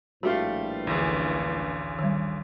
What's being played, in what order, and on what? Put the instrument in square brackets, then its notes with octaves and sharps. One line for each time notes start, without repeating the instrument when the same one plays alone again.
[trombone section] A#1 A2 B4 [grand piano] G3 A3 F4 [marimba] F#4
[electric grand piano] A1 D2 G#4
[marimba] D#3 G3